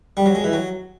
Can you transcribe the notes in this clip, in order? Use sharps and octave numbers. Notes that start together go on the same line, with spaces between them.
G3
F#3
G#3
E3
F#3